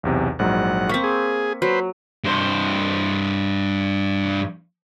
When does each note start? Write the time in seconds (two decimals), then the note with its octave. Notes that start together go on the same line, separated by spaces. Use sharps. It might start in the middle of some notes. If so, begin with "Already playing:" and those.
0.03 B1 E2 C3
0.39 A#1 G#2 F#3 F#5
0.89 A#3 C4 C#6 B6
1.04 G#4
1.62 F#3 B4 C5
2.24 G2 C5